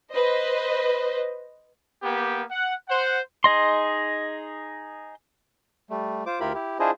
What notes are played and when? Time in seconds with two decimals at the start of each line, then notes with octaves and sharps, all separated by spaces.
0.12 B4 C5 D#5
2.03 A#3 B3 G4
2.51 F#5
2.89 C5 F#5
3.44 D#4 G#4 D#5 C6
5.90 G3 A3
6.26 F4 C5 D6
6.40 D2 E4 F4 G4 A#4 B5
6.54 E4 G4
6.79 D4 E4 F4 G#4 C5 D#5